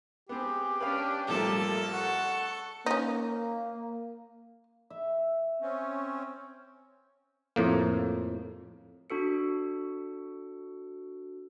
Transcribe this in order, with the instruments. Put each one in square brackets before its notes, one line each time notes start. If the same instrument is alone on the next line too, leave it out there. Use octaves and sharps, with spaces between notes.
[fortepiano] B3 C4 [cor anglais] G4 [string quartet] G#4
[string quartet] C#4 D4 [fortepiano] B4 C#5 F5
[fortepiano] A1 F3 [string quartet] G3 A3 A#3 [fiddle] A4
[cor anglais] F#5 [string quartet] C#6
[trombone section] A#3 [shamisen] C#4 D#4
[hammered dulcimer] E5
[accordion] C4 C#4
[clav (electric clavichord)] F2 A2 A#3
[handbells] D4 F#4 A4 C#7